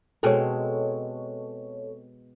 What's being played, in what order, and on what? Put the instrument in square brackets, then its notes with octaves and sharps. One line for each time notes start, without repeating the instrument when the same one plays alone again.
[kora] B2 G#3 C4 [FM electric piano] A4 C#5